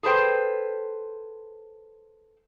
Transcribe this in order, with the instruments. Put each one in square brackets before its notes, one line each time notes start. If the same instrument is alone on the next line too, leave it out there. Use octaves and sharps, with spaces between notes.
[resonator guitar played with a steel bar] G#4 A4 B4 C5 G5